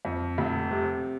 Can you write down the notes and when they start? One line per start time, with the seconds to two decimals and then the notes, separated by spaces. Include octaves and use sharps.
0.05 F2
0.38 F1
0.71 C3